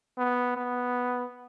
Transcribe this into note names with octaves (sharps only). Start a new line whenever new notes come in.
B3
B3